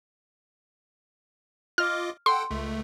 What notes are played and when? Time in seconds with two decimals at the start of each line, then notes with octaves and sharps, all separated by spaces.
1.78 F4 D#5 D6 F6
2.26 A4 F#5 G5 C6
2.51 C#2 A3